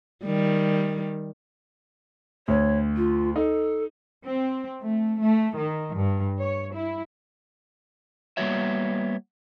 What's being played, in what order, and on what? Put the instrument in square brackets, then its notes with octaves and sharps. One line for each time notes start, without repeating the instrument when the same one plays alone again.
[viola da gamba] D#3 G3
[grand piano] D2 [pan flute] C#5
[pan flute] F4
[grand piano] D#4 [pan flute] A4
[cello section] C4
A3
A3
D#3
G2
C#5
E4
[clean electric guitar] G3 A#3 B3 F#4 C#5 E5